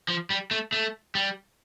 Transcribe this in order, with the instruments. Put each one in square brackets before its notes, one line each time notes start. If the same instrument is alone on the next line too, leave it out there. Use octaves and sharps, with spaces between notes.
[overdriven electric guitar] F3
G3
A3
A3
G3